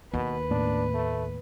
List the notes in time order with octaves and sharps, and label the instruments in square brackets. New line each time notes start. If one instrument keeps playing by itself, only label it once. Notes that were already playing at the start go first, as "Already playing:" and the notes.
[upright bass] D#2 [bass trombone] B2 [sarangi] B4
[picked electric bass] A2 A#3 B3 [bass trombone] D4
[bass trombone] A3